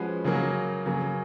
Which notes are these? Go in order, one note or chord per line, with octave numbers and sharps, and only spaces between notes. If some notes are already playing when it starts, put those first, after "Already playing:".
Already playing: F3 G#3 C#4 F#4 B4
C#3 F#3 A#3
C#3 F#3 A#3